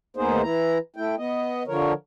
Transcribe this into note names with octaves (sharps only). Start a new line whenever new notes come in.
D2 A#3 B3 D#4 G#4 C5
E3 E4 A#5
A3 E4 G5
B3 D#5
D3 F3 A#4 C#5